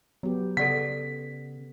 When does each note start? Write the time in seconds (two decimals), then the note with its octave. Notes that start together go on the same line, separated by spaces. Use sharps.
0.23 F#3 B3 G4
0.57 C#3 A4 D5 F#5 B6